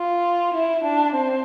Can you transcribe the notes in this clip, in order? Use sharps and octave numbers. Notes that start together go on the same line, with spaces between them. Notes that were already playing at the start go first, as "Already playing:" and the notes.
Already playing: F4
E4
D4
C4